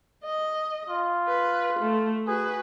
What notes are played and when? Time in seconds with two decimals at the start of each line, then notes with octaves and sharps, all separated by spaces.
0.24 D#5
0.89 F4
1.27 B4
1.79 A3
2.27 F#4 G#4 B4